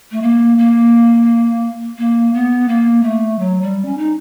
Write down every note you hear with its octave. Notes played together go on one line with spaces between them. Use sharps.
A3
A#3
A#3
A#3
B3
A#3
A3
F#3
G3
C#4
D#4